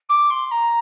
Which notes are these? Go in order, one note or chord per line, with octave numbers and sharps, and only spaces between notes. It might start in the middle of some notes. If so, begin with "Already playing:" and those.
D6
C6
A#5